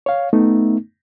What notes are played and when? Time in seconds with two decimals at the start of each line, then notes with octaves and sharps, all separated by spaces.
0.06 C#5 F5
0.33 A3 B3 D#4